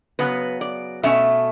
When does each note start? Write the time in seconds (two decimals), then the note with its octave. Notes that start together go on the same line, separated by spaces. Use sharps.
0.19 C#3 F#3 B3 B4
0.61 D5
1.03 B2 A3 C#4 E5